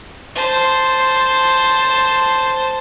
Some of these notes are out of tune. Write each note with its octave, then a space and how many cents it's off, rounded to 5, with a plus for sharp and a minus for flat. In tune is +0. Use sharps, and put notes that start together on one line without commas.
C5 +0 A5 +0